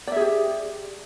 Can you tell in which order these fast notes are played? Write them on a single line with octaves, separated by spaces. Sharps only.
D5 E5 G#4 G4